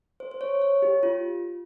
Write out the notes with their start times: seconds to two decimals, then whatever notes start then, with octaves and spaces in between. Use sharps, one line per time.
0.20 C5
0.31 C5
0.41 C#5
0.62 C#5
0.82 G4
1.03 F4